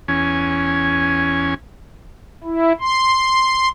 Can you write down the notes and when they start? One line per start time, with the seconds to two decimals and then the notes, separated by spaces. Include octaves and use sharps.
0.08 E2 C#4 G#5
2.44 E4
2.80 C6